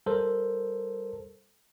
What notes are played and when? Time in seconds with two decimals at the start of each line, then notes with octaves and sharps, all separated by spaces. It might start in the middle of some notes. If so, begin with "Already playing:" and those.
0.06 G3 A4 A#4 C5